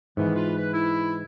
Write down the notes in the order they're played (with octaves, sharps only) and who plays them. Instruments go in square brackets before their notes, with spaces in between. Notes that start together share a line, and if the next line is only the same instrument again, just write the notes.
[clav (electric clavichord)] G#2 E3 [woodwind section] D#3 B3
[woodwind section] F4 B4
B4
E4